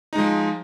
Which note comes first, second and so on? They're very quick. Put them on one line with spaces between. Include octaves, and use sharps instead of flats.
D#4 G#3 F3